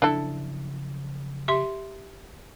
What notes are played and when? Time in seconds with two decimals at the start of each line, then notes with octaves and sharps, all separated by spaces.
0.02 C#3 F3 F#3 D4 E4 A4
1.48 G4 E5 C6